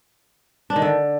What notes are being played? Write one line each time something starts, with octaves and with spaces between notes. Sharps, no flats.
D4
D#3
D3